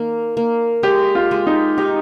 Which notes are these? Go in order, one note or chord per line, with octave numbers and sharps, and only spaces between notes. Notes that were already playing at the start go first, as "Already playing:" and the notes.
Already playing: D#3 A#3
A#3
G#3 G4
F4
G#3
D#4
D#4 G4